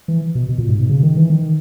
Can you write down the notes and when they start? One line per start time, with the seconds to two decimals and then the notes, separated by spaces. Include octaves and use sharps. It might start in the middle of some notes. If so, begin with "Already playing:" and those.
0.08 E3
0.35 B2
0.49 B2
0.58 A#2
0.69 G#2
0.79 B2
0.89 C#3
1.03 D#3
1.16 E3
1.30 D#3